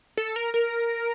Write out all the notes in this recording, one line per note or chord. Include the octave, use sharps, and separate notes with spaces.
A4
A#4
A#4